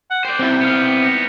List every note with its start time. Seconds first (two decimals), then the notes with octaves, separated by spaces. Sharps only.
0.10 F#5
0.25 C5 D5 G5
0.39 C3 C4 E4
0.61 B3 F5
1.01 D#4